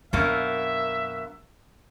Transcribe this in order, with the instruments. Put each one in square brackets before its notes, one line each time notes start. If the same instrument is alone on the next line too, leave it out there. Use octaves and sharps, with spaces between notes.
[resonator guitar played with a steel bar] F#2 B2 A#3 [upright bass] D4 [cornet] E5